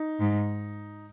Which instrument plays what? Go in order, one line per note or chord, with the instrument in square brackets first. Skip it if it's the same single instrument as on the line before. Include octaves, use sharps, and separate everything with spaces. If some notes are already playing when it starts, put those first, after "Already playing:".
Already playing: [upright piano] D#4
[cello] G#2